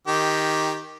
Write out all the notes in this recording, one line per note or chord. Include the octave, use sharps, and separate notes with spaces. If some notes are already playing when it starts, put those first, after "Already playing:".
D#3 G4